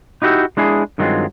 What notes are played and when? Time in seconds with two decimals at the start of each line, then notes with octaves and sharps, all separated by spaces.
0.22 D#4 E4 F#4 G4 E5
0.57 G#3 D4 E4 G#4
0.98 G2 D#3 F#3 G#3 C4 F4